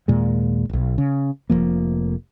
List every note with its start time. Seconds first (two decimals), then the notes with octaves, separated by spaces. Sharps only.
0.08 D#2 A#2 G#3
0.70 E1 B1
0.98 C#3
1.50 F1 F#2 F3 A#3